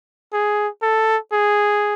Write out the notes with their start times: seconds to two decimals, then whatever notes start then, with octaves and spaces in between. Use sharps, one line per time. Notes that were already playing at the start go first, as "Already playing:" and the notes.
0.33 G#4
0.82 A4
1.32 G#4